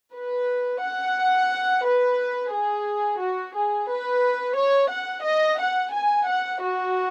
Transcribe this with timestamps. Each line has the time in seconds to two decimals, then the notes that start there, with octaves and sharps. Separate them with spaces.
0.14 B4
0.82 F#5
1.84 B4
2.52 G#4
3.20 F#4
3.54 G#4
3.88 B4
4.56 C#5
4.91 F#5
5.24 D#5
5.58 F#5
5.92 G#5
6.26 F#5
6.61 F#4